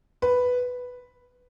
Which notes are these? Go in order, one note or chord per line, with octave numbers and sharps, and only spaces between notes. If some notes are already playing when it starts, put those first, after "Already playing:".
B4